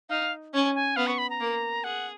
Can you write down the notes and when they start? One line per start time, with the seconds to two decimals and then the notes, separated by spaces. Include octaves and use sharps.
0.09 D#4 F5
0.53 C#4 G#5
0.75 G#5
0.96 B3 F5
1.07 C#6
1.18 B5
1.30 A#5
1.40 A#3
1.84 G#4 F#5